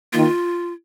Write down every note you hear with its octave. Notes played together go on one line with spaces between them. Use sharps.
D#3 A#3 F4